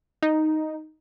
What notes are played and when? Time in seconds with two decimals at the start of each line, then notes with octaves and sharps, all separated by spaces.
0.23 D#4